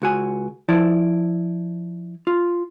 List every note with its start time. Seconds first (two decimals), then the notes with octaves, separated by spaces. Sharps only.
0.02 C#2 F#4 G#5
0.69 F3 E4 D5 A5
2.27 F4